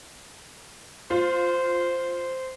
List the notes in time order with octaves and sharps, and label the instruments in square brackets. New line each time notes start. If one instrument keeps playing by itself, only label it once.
[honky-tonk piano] F4 [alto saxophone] C5